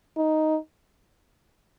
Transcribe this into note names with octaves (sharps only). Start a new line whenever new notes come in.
D#4